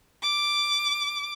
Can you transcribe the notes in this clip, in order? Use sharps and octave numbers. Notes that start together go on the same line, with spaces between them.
D6